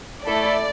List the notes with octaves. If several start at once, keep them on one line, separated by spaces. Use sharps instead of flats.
A3 E4 A4 D5